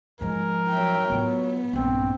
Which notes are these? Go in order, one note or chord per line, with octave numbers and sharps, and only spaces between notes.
G#2 F3 G#3 A#4
F#3 E5 G5
A2 B3 F4
A#1 G2 C4